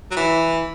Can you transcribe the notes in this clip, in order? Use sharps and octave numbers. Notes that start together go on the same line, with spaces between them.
F#3
E3